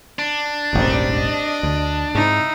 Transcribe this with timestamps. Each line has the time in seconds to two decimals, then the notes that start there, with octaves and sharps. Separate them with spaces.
0.19 D4
0.73 E1 A1 D#2 G3 C4 D#4
1.14 D#5
1.63 D2
2.15 G#2 C3 D#4 E4